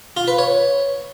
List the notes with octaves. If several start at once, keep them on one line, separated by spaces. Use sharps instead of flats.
F4
B4
C#5